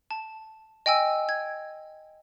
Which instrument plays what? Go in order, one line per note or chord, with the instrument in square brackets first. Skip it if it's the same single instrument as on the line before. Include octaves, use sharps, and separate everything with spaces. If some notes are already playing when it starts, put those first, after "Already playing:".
[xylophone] A5
D#5 G5 G#5 E6
G#6